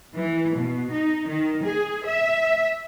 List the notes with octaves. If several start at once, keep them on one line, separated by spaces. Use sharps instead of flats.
E3
B2
D#4
D#3
G#4
E5